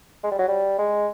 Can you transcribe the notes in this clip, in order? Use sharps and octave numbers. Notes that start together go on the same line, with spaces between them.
G#3
G3
F#3
G3
G#3